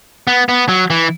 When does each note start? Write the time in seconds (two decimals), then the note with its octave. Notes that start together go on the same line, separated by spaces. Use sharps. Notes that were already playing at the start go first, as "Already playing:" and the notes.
0.27 B3
0.49 B3
0.69 F#3
0.90 E3